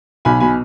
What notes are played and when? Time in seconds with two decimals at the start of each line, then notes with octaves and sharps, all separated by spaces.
0.25 B1 G#5 B5
0.40 B2 G#5 B5